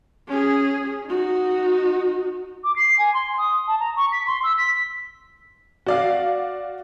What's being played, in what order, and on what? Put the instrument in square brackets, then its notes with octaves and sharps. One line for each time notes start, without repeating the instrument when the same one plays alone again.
[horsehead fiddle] C#4 G#4
D#4 F#4
[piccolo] D6
C7
G#5
C6
D#6
A5
A#5
C#6
B6
C6
E6
B6
[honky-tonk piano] F#4 D5 F5